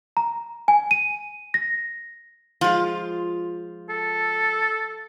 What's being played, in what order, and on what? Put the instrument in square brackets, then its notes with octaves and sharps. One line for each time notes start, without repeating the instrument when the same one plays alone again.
[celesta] A#5
G#5
D#7
A#6
[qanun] F3 G#3 [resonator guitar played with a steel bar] F4
[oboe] A4